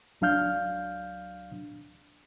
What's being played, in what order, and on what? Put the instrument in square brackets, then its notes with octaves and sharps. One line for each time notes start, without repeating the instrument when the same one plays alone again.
[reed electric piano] C#2 F#3 D4 F5 F6 G6